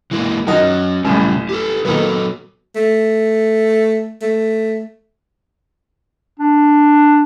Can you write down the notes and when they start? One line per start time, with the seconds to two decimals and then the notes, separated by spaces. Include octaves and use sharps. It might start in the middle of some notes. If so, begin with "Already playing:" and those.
0.11 E3 G#3 A#3
0.47 D#3 F#3 C#4 D#4 F#4
1.05 A1 F#2 C#3 G3 C#4
1.49 G4 A4
1.85 D#3 F#3 A#3 B3 A4
2.75 A3
4.22 A3
6.39 D4